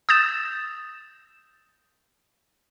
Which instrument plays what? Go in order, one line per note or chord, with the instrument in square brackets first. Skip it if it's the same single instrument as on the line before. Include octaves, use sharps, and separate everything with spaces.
[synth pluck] D#6 E6 G6 A6 E7